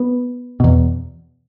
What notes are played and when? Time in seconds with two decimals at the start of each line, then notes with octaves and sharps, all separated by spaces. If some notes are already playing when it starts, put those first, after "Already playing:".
Already playing: B3
0.60 E2 B2